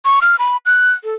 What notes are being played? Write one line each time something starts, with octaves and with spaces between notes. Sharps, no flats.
C#6
F6
B5
F#6
A4